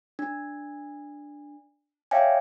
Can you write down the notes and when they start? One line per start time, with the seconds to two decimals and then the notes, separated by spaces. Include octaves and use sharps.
0.19 D4
2.11 C#5 D5 E5 F5 G5 G#5